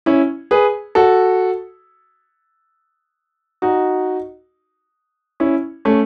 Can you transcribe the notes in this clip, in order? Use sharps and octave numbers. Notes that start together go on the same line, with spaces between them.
C#4 E4
G#4 B4
F#4 A4
D#4 F#4
C#4 E4
A3 C#4